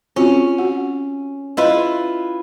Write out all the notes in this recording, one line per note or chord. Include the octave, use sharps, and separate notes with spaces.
C4 C#4 F4 F#4
F#4 F#5
E4 F4 B4 D#5